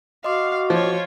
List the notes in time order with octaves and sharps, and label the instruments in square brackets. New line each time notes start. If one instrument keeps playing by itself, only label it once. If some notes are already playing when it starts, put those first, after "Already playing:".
[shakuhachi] F#4 [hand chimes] D#5 C6 D6 [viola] F5
[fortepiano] F3 [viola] F4 C#5